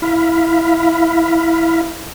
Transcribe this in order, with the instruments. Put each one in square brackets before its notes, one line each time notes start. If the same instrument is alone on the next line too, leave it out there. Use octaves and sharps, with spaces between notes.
[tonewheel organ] E4 F5 B5